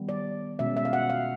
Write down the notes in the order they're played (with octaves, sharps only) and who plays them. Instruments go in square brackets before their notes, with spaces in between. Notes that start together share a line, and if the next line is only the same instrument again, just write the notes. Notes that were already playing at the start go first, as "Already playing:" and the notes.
Already playing: [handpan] D#3 G3 B3
D5
B2 G#3 C#4 E5
E5
F5
F#5
F5